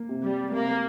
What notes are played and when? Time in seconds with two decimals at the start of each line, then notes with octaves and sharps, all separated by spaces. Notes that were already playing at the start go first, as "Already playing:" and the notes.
Already playing: A#3
0.09 C3
0.23 G3
0.53 C3 A#3